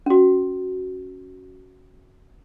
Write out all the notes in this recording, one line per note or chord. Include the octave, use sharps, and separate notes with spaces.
C#4 F#4